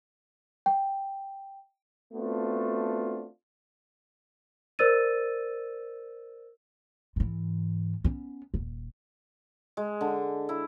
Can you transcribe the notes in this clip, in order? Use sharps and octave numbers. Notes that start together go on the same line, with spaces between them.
G5
A3 B3 C4 D4 F4 F#4
A#4 C5 D5 E6 A6 D#7
G#2 E3
B3 C#4
D#1
G#3
D3
E4